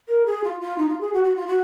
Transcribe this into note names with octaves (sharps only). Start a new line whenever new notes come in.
A#4
G#4
F4
F4
D#4
F4
G#4
F#4
F#4
F4
F#4